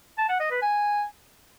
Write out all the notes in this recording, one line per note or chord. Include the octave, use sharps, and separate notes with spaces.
A5
F#5
D#5
B4
G#5